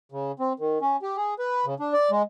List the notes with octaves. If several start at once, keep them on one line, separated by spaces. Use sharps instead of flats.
C#3
C4
D#3
C#4
G4
G#4
B4
C#3
D4
D5
G#3